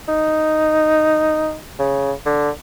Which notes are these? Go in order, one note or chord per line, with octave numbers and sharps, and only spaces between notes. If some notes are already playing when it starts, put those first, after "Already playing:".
D#4
C#3
D3